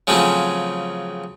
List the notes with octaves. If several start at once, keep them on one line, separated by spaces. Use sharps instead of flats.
C#3 F3 F#3 A3 C4 C#4